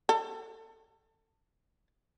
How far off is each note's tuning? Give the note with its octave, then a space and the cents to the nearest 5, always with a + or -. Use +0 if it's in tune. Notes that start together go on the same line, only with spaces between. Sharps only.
A4 +25